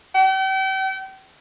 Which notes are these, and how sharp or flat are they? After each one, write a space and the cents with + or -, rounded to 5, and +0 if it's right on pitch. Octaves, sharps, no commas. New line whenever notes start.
G5 -40